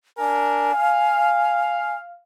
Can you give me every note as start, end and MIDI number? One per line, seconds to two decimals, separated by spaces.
0.18 0.72 62
0.18 0.72 70
0.18 1.95 80
0.74 2.22 77